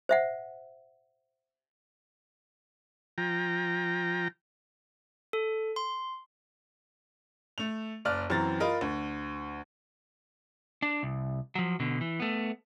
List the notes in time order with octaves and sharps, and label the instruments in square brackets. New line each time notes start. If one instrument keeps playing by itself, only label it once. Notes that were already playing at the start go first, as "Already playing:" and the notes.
[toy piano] C5 E5 F#5
[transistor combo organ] F3 G5 A#5
[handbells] A4
C6
[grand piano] A3 F7
F#1 D5 F6 F#6
F#2 E3 C4 A#5 A6
F4 A#4 D#5 B5
D2
[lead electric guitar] D4
C2
F3 F#3
B2 D3
E3
A3 B3